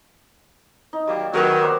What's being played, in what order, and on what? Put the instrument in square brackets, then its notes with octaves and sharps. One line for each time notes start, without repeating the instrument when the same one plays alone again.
[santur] D#4
[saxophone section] D#3 F#3 A#3 [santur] G3 E6
[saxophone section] D#3 [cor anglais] F#3 [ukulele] F#4 A#4 B4
[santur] A#3 C5 F#5